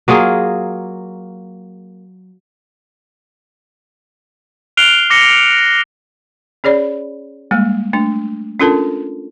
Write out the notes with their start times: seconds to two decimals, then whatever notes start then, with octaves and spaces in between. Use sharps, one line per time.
0.08 F#3 A#3 F4 G#4
4.77 F6 F#6 C7 D7 F7 G7
5.10 D6 A#6 C#7 G7
6.64 C#4 G#4 C#5 D5 B5
7.51 G3 G#3 A#3
7.93 A3 D4
8.60 C#4 D4 F4 A4 A#4 A5